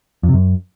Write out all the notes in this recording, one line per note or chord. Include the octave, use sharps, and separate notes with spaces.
F2
C3
F#2